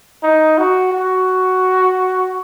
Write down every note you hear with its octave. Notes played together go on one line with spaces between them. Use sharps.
D#4
F#4
F#4